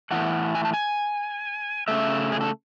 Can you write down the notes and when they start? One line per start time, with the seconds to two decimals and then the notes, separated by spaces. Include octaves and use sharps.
0.11 A2 E3 A3 F#5
0.55 G#5
0.65 A5
0.74 G#5
1.88 C#3 E3 A3 E5
2.32 G#4
2.41 A4